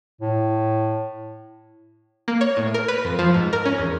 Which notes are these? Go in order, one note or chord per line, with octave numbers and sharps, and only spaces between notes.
A2
A#3
C#5
A2
A#4
B4
F2
F3
G#2
A#4
C#4
E2